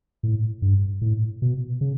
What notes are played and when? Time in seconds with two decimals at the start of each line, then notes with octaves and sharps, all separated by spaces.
0.23 A2
0.62 G2
1.01 A2
1.42 B2
1.81 C#3